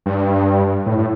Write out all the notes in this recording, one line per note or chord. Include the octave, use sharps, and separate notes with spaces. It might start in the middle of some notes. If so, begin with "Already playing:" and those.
G2
A2
A2